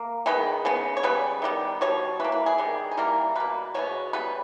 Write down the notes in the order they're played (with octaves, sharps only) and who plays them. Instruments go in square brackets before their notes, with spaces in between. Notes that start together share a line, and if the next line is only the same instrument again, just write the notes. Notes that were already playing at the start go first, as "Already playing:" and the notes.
Already playing: [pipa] A#3
D#3 G#3 B3 B4
C#3 G#3 B3
C#5
C#3 G3 B3 B4
D#3 G3 B3
B2 G3 C#5
E3 B4
A#3
B4
G#4
D#3 G3 B3
G#4
E3 G3 A#3 A#4
B2 A#3 B4
B2 G#3 B3 C#5
C#3 G3 B3 B4